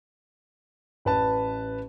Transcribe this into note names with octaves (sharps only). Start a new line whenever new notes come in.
A1 B4 A5